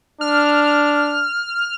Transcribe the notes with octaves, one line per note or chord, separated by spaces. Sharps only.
D4 F6